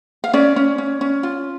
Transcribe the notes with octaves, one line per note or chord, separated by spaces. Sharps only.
F5
C#4 D5
C#4
C#4
C#4
F4